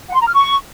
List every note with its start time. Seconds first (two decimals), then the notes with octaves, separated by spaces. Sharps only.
0.08 F#5
0.14 C6
0.21 A#5
0.27 F6
0.34 C#6